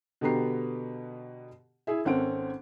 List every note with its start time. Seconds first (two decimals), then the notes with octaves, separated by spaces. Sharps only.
0.21 B2 D3 B3 G4 A#5 C7
1.87 E4 G#4 E5
2.05 G#1 C4 C#4 A4 F#5 D7